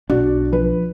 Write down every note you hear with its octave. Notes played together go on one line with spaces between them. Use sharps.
B1 D4 F#4 D5
F3 B4